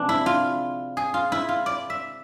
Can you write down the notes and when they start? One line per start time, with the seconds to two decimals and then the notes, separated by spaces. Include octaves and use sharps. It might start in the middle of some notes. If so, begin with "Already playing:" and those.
Already playing: C3 F3 G#3 D4 B4
0.09 E4
0.26 F4
0.97 G#4
1.14 F4
1.32 E4
1.49 F4
1.66 D5
1.90 E5